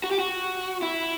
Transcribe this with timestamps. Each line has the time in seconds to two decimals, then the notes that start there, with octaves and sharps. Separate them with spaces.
0.04 F#4
0.11 G4
0.19 F#4
0.82 E4